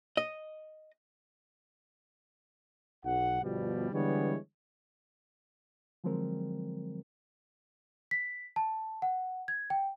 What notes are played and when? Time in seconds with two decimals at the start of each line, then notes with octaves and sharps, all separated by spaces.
0.17 D#5
3.05 B1 F#5
3.43 G1 G2 B2 F3 G3
3.92 D3 E3 G3 G#3 B3 C#5
6.04 D3 F3 F#3 G#3 C4 A#4
8.11 B6
8.56 A5
9.02 F#5
9.48 G#6
9.70 G5